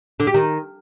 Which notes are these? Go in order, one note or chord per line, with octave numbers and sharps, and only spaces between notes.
D3
G4
D#3